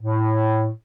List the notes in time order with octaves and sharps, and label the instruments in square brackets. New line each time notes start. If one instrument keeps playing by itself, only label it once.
[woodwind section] A2